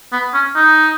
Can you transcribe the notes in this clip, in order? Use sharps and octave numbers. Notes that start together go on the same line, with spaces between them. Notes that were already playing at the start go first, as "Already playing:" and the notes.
B3
C#4
D#4